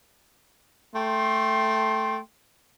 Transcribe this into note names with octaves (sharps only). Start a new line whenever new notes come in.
A3 G5 C6